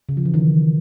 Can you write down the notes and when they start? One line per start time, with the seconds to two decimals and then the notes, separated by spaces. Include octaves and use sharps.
0.09 C#3
0.17 F3
0.25 E3
0.34 D#3